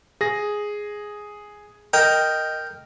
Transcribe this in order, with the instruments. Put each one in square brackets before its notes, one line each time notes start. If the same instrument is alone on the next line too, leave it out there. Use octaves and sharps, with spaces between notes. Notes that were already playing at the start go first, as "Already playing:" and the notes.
[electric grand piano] G#4 A#6
[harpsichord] A#4 G5 [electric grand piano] D#5